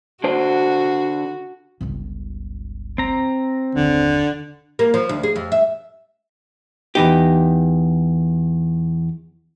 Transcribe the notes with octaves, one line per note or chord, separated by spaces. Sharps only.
D3 F#4 C5
G1 C#2
C4 A#5
F#1 D#2 D3
A#3
F3
D2
G#4
F2
E5
E2 D#4 G4